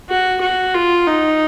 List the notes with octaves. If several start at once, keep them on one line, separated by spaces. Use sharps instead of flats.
F#4
F#4
F4
D#4